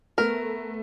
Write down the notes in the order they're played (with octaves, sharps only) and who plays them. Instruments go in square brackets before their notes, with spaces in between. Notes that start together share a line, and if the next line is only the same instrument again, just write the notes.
[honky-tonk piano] A3 B3 [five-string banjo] A#4